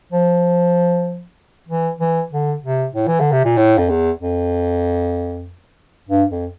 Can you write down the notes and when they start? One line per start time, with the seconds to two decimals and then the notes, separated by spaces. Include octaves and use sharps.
0.12 F3
1.68 E3
2.00 E3
2.32 D3
2.63 C3
2.95 A2
3.07 E3
3.20 D3
3.32 C3
3.45 A#2
3.57 A2
3.78 F2
3.89 E2
4.20 F2
6.09 G2
6.31 F2